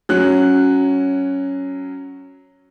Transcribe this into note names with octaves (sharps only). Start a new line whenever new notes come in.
F#3 C#4 F#6